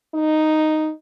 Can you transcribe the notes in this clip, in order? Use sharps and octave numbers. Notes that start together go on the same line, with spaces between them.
D#4